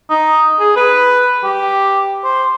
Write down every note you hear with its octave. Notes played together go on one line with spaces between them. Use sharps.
D#4
G#4
B4
G4
C5